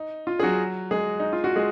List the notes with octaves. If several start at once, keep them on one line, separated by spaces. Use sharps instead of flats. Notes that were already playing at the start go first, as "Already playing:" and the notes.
Already playing: D#4
F4
G#4
F#3 F#4
G#3 G#4
D#4
F4
F#4
G#3 G#4